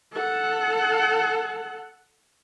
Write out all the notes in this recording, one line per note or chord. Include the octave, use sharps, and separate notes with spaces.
A4 F#5